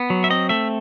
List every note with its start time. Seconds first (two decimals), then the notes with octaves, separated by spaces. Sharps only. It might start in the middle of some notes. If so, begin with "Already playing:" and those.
Already playing: B3
0.10 F#3
0.24 E5
0.30 C4 D#5
0.49 A3 E5